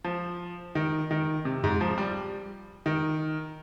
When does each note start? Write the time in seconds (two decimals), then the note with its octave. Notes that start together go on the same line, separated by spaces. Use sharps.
0.04 F3
0.75 D#3
1.11 D#3
1.45 C3
1.64 G#2
1.81 F3
1.98 G3
2.86 D#3